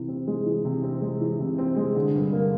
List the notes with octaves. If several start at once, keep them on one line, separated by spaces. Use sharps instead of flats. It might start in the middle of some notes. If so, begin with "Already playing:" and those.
Already playing: C3 E3
C4
G#3
E3
C3
C4
G#3
E3
C3
C4
G#3
D3
G2
A#3